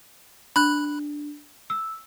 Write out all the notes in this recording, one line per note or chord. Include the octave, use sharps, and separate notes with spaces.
D4 B5 F#6
E6